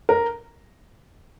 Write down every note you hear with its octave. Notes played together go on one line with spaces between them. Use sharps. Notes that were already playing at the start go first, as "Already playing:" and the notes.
A#4